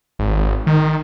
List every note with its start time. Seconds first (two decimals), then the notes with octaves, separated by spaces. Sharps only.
0.19 G#1
0.67 D#3